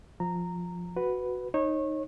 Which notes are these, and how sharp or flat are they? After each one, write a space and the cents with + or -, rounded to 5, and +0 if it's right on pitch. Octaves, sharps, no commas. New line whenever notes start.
F3 +10 A#5 -15
F#4 +0 B4 +0
D#4 +0 C#5 -30